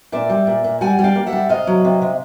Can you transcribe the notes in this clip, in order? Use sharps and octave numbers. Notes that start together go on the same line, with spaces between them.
A#2 D5 E5
G3
A#2
A#2
G3 F#5 G#5
G3
F5 G5
A#3
E5 F#5
G3
C3 D#5 F5
F#3
C3
C3